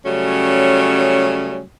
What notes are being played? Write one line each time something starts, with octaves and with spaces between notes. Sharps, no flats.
C#3 F#3 G3 A3 C#4